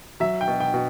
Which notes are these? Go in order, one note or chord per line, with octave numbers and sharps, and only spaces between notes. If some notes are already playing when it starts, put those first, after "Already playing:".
F#3 E5
G5
B2
G5
B2